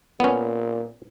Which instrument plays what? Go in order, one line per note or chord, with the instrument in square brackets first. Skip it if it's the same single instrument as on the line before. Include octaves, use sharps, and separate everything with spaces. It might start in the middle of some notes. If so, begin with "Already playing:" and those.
[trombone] A#2 [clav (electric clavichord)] B3 C#4